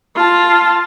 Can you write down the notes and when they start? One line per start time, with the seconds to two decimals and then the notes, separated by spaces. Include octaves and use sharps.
0.15 F4 A5